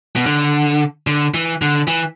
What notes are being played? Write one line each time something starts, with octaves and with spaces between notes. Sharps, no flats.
B2
D3
D3
E3
D3
E3